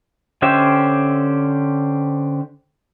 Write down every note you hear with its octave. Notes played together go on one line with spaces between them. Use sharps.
D3 C#4 G4 C5 E5